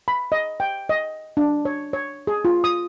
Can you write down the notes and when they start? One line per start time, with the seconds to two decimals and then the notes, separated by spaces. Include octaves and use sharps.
0.08 B5
0.32 D#5
0.60 G5
0.89 D#5
1.37 D4
1.65 C#5
1.93 C#5
2.27 G#4
2.45 F4
2.64 D#6